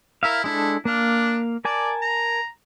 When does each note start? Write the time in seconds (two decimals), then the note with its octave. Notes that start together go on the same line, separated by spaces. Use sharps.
0.23 E4 A#4 E5 F5
0.44 G#3 D4 E4 A4
0.85 A#3 D4 F5
1.65 A#4 D5 G#5 A5
2.02 A#5